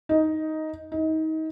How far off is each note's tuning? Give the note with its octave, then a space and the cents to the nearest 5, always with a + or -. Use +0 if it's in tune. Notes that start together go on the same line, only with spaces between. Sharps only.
D#4 +10
D#4 +30